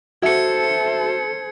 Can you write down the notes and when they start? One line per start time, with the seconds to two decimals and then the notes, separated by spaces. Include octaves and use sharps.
0.22 F#4 A4 C5 E5 G#6 C#7